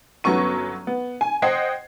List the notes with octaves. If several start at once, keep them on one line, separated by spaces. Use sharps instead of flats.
G1 F#3 B3 C#4 C#6 D#7
B3
G#5
C5 D#5 F#5 G5 G#6 C7